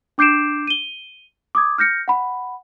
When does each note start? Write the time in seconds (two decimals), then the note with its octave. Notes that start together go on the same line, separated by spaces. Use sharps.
0.18 D4 D6 G6 C7 D7 E7
0.67 D#7 G7
1.55 D6 D#6 G#6
1.78 F6 G6 A#6 C#7
2.08 F#5 B5